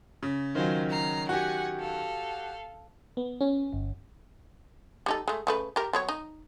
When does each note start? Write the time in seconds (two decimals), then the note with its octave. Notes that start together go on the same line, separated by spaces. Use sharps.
0.23 C#3
0.55 D#3 F#3 C#4 F4 C5
0.89 A#5 C7
1.29 F#4 G4 F#5 G#5
1.79 A4 F5
3.17 B3
3.41 C#4
3.73 G1
5.06 G3 D#4 A4
5.28 G#3 A3
5.47 C#3 A3 B4
5.76 G4 A#4
5.93 F#3 B3 C#5
6.09 D#4